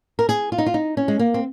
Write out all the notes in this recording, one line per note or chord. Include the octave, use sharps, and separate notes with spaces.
A#4
G#4
F4
D#4
F4
D#4
C#4
G#3
A#3
C4